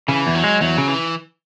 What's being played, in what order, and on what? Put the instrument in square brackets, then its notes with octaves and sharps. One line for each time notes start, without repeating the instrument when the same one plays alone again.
[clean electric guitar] C#3 [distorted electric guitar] E3
[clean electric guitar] E2
[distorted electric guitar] F#3
[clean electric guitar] G#3
[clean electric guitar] E2 [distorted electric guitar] F#3
[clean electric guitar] C#3
[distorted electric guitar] E3